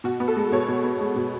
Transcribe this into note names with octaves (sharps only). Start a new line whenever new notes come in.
B2 F#4
B3
A4
G#3
B2 C#5
B2
B3
G#3
B2